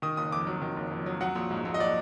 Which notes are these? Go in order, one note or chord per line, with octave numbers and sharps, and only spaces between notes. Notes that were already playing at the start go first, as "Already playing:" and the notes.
D#3 D#6
F#1 D#6
F2 D6
F#3
D#3
F#1
F2
F#3
F#3 F#5
A#1
G#2
A#1
D#5
F#3 D5